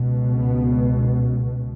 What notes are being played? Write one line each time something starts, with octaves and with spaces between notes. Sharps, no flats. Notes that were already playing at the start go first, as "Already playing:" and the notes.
Already playing: C#2 B2
B3